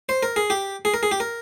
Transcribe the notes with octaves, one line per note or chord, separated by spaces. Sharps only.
C5
A#4
G#4
G4
G#4
A#4
G#4
G4
A#4